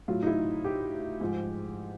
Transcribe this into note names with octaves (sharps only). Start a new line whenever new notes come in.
A2 F#3 F4
D#4
E4
G4
G#2 F3 G#3